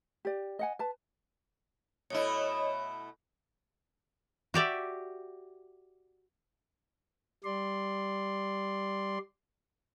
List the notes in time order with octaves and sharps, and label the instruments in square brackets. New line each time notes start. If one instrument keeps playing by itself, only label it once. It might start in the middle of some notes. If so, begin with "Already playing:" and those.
[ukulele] G4 D5
D#5 F#5 G#5
B4 A5
[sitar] B2 A3 E4 [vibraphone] C#5 D#5
[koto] F#4 G4 D5 E5
[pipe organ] G3 D5 C6